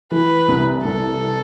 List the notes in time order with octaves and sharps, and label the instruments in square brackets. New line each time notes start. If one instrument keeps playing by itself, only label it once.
[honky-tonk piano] E3 [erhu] B4
[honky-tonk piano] C2
[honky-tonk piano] C2 [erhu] A4